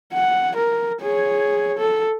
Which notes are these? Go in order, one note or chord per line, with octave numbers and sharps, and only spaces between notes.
F#5
A#4
G#4 C#5
A4